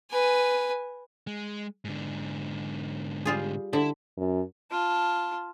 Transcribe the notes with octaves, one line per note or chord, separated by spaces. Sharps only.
B4 G#5
G#3
G#2 D3
G3 F4 G#4
D3 E4
F#2
F4 A5